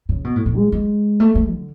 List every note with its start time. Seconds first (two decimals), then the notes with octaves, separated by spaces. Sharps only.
0.09 C#3
0.24 B2
0.36 A2
0.46 A2
0.56 G#3
0.72 G#3
1.20 A3
1.35 A3
1.51 D3